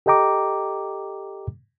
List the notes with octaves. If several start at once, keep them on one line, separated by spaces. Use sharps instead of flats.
G4 A4 D#5 G5 A#5 D6